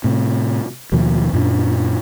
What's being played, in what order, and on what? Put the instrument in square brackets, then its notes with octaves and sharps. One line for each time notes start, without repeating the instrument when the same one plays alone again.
[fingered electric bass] A2 C3
D#2 B2 D#3 F3
F#2 A#2 D4